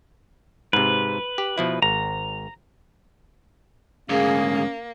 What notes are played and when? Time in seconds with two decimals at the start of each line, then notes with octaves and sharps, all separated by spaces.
0.73 G#2 C3 B4
1.38 G4
1.58 B2 F3 E4
1.82 G#1 A#5
4.09 D2 G#2 A#3 C#4 G#4 F5